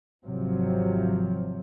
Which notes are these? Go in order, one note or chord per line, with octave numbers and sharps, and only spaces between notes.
G#1 C3 F3 F#3